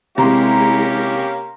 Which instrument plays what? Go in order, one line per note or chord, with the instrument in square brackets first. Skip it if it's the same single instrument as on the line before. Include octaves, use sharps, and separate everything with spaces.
[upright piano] C3 [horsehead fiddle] G#3 E4 [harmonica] A#3 C#4 G4 [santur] A#5 C6